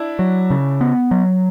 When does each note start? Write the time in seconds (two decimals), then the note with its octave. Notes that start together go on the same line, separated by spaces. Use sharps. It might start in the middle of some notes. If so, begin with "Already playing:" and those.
Already playing: D4 E4
0.19 F#3
0.50 C#3
0.81 B3
1.11 F#3